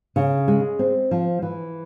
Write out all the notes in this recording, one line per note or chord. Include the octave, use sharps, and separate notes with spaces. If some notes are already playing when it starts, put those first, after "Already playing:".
C#3
G#3
C4
F3
E3